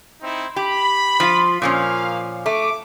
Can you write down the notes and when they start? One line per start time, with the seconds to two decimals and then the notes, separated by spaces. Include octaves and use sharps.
0.21 C4 D#4 E4
0.56 G4 B5
1.20 F3 F4
1.62 A#2 F3 A#3 C#4 F5
2.46 A3 D6